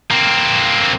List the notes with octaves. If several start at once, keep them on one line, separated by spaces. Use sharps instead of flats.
A#3 C4